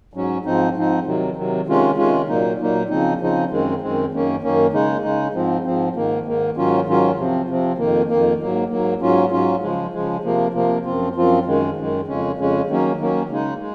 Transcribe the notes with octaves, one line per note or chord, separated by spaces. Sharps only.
G#2 F#3 C#4
G#2 F3 C4 D#4
G#2 F3 C4 D#4
C3 D#3 F#3
C3 D#3 F#3
C3 D#3 G#3 C#4 F4
C3 D#3 G#3 C#4 F4
A#2 F#3 A#3 D#4
A#2 F#3 A#3 D#4
C#3 F3 C4 D#4
C#3 F3 C4 D#4
F#2 D#3 G#3 C4
F#2 D#3 G#3 C4
F#2 D#3 A#3 C#4
F#2 D#3 A#3 C#4
C#3 G#3 D#4
C#3 G#3 D#4
G#2 F3 C4
G#2 F3 C4
G#2 D#3 A#3
G#2 D#3 A#3
G#2 D#3 F#3 C#4 F4
G#2 D#3 F#3 C#4 F4
C3 F3 C4
C3 F3 C4
F2 D#3 A#3
F2 D#3 A#3
G#2 F#3 A#3
G#2 F#3 A#3
G#2 F#3 C#4 F4
G#2 F#3 C#4 F4
C#3 F3 G#3
C#3 F3 G#3
C3 F3 A#3
C3 F3 A#3
F#2 F3 C4 F4
F#2 F3 C4 F4
F#2 D#3 G#3
F#2 D#3 G#3
F2 C#3 G#3 C#4
F2 C#3 G#3 C#4
D#3 F#3 A#3 C#4
D#3 F#3 A#3 C#4
C#3 G#3 D#4
G#3